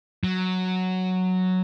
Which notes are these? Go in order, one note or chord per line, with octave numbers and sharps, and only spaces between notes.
F#3